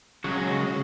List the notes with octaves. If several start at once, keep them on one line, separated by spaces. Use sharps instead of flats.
C#3 F#3 G#3 F#4